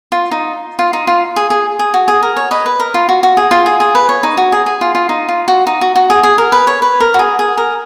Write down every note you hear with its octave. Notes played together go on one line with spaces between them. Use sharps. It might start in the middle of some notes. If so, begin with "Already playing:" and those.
F4
D#4
F4
D#4
F4
G#4
G#4
G#4
F#4
G#4
A#4
C#5
B4 D#5
B4
A#4
F4
F#4
F#4
G#4
F4
G#4
G#4
B4
C#5
D#4
F#4
G#4
G#4
F4
F4
D#4
F4
F#4
D#4
F#4
F#4
G#4
G#4
A#4
B4
C#5
B4
A#4
F#4
G#4
G#4
A#4